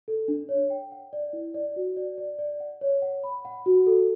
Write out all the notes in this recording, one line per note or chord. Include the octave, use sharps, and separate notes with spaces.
A4
D4
C#5
G5
F#5
D5
E4
D5
F#4
D5
D5
D5
F#5
C#5
F#5
B5
F#5
F#4
A4